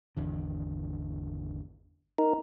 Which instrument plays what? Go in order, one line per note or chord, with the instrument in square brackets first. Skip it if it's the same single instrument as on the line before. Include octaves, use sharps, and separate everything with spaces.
[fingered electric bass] G#1 E2 D3
[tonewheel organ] D#4 A#4